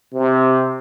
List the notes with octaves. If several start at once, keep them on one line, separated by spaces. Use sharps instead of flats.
C3